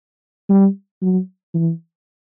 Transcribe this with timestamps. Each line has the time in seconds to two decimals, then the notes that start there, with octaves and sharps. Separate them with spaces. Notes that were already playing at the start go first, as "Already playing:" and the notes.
0.49 G3
1.02 F#3
1.54 E3